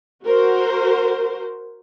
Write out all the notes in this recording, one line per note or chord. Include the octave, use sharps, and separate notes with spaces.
F#4 A#4 C5